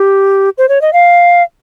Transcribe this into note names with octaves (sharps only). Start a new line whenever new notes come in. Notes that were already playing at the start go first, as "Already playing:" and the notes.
Already playing: G4
C5
C#5
D#5
F5